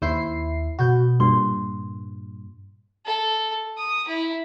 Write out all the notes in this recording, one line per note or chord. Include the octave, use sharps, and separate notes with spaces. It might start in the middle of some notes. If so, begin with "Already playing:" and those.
D#2 E4 C5 C7
B2 F#4 G6
G2 A#2 C6
A4
D#6
E4